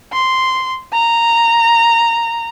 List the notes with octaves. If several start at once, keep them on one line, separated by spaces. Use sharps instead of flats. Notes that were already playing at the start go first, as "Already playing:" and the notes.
C6
A#5